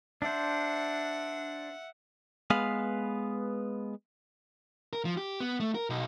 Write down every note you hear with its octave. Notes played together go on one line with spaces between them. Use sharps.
D4 C5 E5 F#5
G#3 B3 B4 F5
A#4
F3
G4
B3
A3
A#4
B1